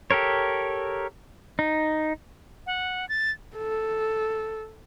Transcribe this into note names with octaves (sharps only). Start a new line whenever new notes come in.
G4 A4 A#4 C#5
D#4
F#5
A6
A4